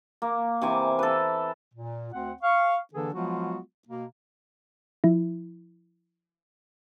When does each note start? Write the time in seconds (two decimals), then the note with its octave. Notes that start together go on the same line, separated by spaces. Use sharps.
0.22 A#3
0.62 C3 E3 G#5 D6
0.99 A4 B4
1.74 A#2
2.13 D2 C4 F#5
2.43 F5 C#6
2.94 D3 E3 A#3 D4 G#4 A4
3.13 F3 F#3 G#3 B3 F4 F#4
3.88 B2 A#3
5.04 F3 E4